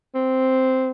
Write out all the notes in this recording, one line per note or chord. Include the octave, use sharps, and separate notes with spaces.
C4